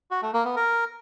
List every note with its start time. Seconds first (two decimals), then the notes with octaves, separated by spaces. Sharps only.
0.11 F#4
0.22 A3
0.34 A#3
0.45 B3
0.56 A#4